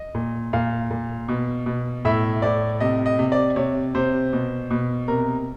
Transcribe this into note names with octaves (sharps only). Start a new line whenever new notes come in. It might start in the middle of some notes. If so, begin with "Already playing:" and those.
Already playing: D#5
A#2
A#2 F5
A#2
B2
B2
A2 E5
A2 D5
C3 D#5
D#5
C3
D5
C3 C#5
C3 C5
B2
B2
C3 A#4